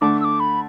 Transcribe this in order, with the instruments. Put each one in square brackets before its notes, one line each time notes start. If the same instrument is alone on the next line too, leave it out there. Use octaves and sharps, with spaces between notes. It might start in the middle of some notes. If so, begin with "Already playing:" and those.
[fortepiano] D3 A3 D4 [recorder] D6
[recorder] E6
D6
B5